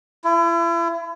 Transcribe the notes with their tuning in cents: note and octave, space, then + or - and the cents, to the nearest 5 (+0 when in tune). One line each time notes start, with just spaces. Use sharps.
E4 +40